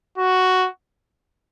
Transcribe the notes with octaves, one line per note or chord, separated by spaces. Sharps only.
F#4